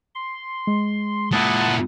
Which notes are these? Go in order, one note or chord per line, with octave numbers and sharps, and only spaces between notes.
C6
G#3
A#2 E4 F#5 A5 D#6